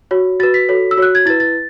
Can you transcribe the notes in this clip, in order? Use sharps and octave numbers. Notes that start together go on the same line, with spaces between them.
F#4 C#5
F#4 B4 A6
B6
F#4 A4 C#5
E6
F#4 C#5 F#6
G#6
E4 B4 A6
A6